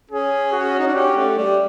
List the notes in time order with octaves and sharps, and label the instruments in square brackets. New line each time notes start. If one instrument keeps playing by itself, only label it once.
[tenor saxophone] C#4 [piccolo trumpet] G#4
[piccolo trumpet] F#4
[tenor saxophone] D#4
D4
[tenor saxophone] C#4 [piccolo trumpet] G4
[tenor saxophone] A3
G3